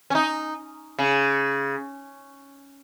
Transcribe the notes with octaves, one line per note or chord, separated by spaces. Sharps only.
C#4
D#4
C#3